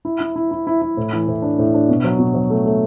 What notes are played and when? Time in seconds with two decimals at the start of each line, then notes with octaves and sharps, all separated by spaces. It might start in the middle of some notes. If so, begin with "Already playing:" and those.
0.05 E4
0.20 E4
0.36 E4
0.51 E4
0.67 E4
0.82 E4
0.97 A2
1.13 E3
1.28 A2
1.42 D4
1.59 A2
1.74 D4
1.89 B2
2.04 F#3
2.19 B2
2.34 F#3
2.50 A3
2.66 A3